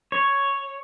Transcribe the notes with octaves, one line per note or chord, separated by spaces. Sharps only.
C#5